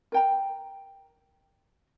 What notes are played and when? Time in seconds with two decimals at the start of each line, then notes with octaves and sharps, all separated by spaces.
0.12 A#4 G5 A#5